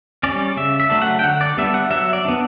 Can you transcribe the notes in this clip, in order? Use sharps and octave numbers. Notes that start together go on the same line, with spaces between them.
G3 C#4 D5
C#3 E5
E5
F#3 A3 D4
F#5
G5
D3 F#5
D5
G3 B3 D4 E5
F#5
F#3 E5
D5
B3 D4